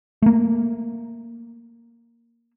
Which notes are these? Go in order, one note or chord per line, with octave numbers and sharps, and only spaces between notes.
A3 A#3